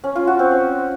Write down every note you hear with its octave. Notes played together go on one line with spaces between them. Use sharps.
C#4
F4
F#4
C4
C#4